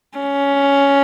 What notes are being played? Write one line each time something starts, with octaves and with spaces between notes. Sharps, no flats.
C#4